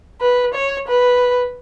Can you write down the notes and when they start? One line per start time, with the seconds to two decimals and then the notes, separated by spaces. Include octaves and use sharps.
0.21 B4
0.54 C#5
0.88 B4